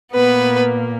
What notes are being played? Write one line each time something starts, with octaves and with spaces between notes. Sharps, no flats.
A#2 A#3 B3 B4